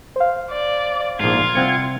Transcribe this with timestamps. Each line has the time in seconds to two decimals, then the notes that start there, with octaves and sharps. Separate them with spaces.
0.16 C5 F5
0.51 D5
1.20 A#1 G#2 F4 G#6
1.55 C2 C4 F#5 C#7